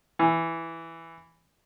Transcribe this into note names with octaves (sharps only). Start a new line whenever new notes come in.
E3